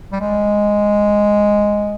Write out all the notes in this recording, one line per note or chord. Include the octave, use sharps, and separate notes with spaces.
G3
G#3